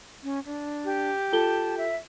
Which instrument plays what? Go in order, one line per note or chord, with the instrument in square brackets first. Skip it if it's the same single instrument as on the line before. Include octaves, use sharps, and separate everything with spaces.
[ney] C#4
D4
[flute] G4
[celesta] F4 A4 G7 [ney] A5
[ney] E5